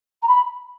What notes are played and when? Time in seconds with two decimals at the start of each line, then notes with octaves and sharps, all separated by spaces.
0.22 A#5
0.27 B5